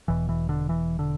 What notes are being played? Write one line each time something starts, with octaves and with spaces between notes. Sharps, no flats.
E1 E2 B2 E3
E3
D3
E3
D3